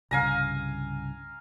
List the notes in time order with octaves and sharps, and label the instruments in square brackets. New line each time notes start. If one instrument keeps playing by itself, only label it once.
[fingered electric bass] C2 G2 C#3 [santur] F5 G#5 A#5